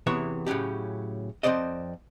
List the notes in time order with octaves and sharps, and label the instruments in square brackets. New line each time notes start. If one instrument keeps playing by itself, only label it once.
[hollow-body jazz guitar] E2 C3 E3 B3 C#5 E5
A2 C#3 F#3 C#4 G4
F2 D#3 C4 C5 D5 D#5